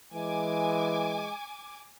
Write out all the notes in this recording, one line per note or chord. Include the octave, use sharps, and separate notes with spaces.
E3 G#3 G#5 D6